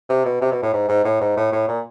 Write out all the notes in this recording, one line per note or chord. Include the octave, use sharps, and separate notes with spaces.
C3
B2
C3
B2
A2
G#2
G#2
A2
G#2
A2
A2
A#2